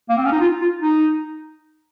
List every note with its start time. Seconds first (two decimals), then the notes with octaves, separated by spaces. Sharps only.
0.09 A#3
0.17 C4
0.25 C#4
0.32 D#4
0.41 F4
0.62 F4
0.82 D#4